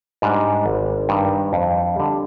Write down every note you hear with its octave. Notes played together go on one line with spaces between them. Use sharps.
G#2 G3 D4
G#1
G2 D#3 G3
F2
D3 G3